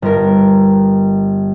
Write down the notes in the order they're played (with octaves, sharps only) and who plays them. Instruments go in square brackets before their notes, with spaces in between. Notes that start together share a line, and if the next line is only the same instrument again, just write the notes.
[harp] G1 A#4